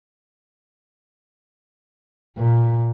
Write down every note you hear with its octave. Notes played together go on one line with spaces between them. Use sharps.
A#2